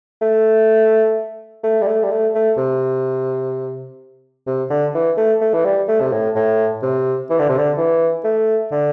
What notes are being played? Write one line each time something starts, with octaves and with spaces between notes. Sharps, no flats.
A3
A3
G3
A3
G3
A3
A3
C3
C3
D3
E3
A3
A3
E3
G3
A3
C3
A2
A2
C3
E3
D3
C3
D3
E3
A3
D3